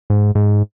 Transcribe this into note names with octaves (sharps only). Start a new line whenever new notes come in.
G#2
G#2